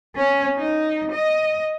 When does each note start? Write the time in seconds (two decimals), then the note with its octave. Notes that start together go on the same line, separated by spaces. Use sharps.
0.15 C#4
0.57 D#4
1.12 D#5